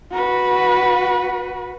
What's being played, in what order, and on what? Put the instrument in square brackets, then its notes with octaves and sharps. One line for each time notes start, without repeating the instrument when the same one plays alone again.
[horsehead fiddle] F#4 B4